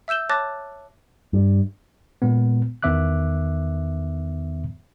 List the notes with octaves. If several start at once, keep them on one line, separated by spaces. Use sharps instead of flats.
E5 E6 G6 E7 G7
C#5 A5 D6 F#6 A6 A#6
G2
A#2 G#3 B3
E2 D#3 B3 E5 D6 F#6